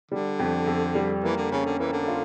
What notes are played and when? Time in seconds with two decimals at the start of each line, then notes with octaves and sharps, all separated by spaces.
0.11 D3 G3
0.39 F2
0.67 F2
0.95 G3
1.23 E3 A#3
1.37 D3
1.51 C#3 C#4
1.66 D3
1.79 E3 A#3
1.92 D3
2.08 F4